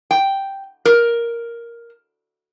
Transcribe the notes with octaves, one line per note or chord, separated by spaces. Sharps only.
G5
A#4